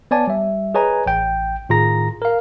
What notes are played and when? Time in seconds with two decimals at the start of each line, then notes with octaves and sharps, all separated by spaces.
0.11 B3 C#5 D5 G#5 A5
0.27 G3 E5
0.74 G#4 B4 C#5 D#5 G#5 A#5
1.06 A1 G5
1.69 A2 D#3 F4 G#4 A#5 A#6
2.22 A#4 F5